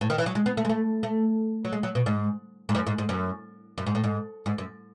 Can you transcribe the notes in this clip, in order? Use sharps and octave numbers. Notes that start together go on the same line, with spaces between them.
A2
D#3
E3
F#3
G#3
B3
A3
G#3
A3
A3
F#3
G#3
F#3
B2
G#2
G#2
F#2
G#2
G#2
F#2
F#2
G#2
A2
G#2
G#2
F#2